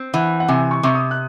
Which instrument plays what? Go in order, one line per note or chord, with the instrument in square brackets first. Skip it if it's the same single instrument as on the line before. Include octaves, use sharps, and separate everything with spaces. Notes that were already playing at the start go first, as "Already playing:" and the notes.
Already playing: [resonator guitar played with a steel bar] C4
[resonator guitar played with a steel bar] E3 [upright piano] F#5
[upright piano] F#5
[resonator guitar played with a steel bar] C3 [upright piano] G#5
[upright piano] C#6
[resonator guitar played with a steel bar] C3 [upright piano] C#6
[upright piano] D#6
F#6